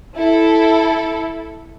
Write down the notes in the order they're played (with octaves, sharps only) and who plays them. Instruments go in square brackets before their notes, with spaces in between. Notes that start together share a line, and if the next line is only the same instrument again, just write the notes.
[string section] E4 A4